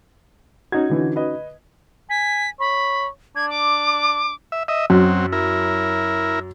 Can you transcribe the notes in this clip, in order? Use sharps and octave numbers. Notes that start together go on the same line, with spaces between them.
C#4 D#4 F#4 G#6
D3 E3
B4 D#5
G#5 B6
C#5 B5
D4 G#6
D6
E5
D#5 E5
F#2 F#3 C4
E4 A#4